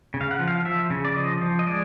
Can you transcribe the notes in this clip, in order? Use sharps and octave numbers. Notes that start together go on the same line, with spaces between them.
C#3
F5
F#5
F3
F5
F3 E5
C#3
D5
F3 D#5
F3
D#5
G#3 D5